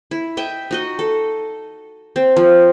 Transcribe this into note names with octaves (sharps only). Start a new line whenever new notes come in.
E4
D#5 E5 G5
D#4 F#4 D#5
A4
C4
F3